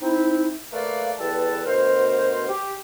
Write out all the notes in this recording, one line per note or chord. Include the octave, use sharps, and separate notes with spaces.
C4 D#4 E4
A3 A#3 B4 D5 F5
E2 G3 A4 B4 A5
D2 B2 A#4 C5
G4